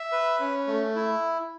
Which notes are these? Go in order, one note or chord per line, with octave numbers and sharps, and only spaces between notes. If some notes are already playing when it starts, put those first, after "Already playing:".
Already playing: E5
B4
C#4
A3
E4